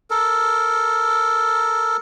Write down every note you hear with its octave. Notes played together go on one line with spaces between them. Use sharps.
A4 A#4